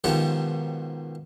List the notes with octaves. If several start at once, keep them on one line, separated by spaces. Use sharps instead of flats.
G#2 B2 D#3 F3 G4 F#5